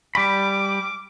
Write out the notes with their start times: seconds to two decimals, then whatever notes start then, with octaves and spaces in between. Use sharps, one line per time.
0.15 G3 B5 D6